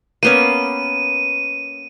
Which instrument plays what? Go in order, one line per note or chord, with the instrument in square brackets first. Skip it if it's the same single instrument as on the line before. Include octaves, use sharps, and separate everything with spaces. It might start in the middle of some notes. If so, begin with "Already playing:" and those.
[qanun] A#3 B3 C#4 [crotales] D#7